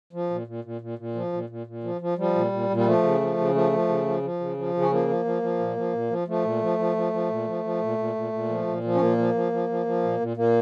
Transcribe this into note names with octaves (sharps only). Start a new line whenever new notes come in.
F3
A#2
A#2
A#2
A#2
A#2
F3
A#2
A#2
A#2
F3
F3
F3 G3
A#2
A#2
A#2
G3
F3 A3
C#3
F3
C#3
F3 A3
F3
C#3
F3
F3
C#3
F3
C#3
C#4
F3 A#3
F3
F3
F3
A#2
F3
A#2
F3
F3 A3
A#2
F3
F3
F3
F3
A#2
F3
F3
A#2
A#2
A#2
A#2
F3
A#2
F3
C#4
A#2 A#3
F3
F3
F3
F3
F3
A#2
A#2
A#2 A#3